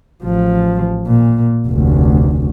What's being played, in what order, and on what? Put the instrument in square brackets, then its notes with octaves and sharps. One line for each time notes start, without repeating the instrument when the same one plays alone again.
[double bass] A1 F3
A#2
F1 D2